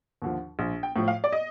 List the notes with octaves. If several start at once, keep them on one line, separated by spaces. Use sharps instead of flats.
D#2 D3 F3
A#1
G5
A2 F3
F5
D5
D#5